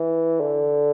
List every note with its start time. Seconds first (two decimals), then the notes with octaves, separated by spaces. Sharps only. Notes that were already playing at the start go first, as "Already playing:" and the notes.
Already playing: E3
0.41 D3